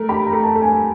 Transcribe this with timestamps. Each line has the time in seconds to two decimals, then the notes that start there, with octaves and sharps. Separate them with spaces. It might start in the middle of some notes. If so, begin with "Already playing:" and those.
Already playing: A3 A#4
0.09 G4 B5
0.27 A#5
0.33 A3
0.43 A5
0.55 A3
0.62 G#5